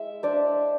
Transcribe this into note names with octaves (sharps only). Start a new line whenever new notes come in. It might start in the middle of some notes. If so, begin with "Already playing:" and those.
Already playing: G#3 E4 E5
D4 C5 D5